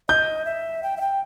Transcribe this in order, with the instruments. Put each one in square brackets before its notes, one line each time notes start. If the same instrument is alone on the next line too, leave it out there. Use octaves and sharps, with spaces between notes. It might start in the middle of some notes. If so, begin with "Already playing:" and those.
[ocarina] D#5 [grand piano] G6
[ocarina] E5
G5
E5
G5